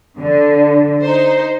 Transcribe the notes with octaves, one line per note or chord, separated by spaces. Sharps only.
D3
D#4 C5